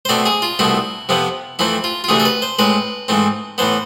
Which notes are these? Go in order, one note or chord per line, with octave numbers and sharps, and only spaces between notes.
C5
B2 A3 C4 D5
G#4
F4
C2 B2 A3 C4 E4
F2 C3 F3 B3
F2 E3 A3 C4 E4
F4
F4
D2 C3 E3 A3 G#4
A4
B4
C5
A2 G#3 C4 B4
G#2 E3 A3 C4
A2 E3 B3 C5